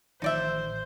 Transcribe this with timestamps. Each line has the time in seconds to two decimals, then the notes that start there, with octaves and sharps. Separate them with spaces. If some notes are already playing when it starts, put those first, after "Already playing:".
0.22 A1 A2 D#3 F3 D#4 C5 D5 E5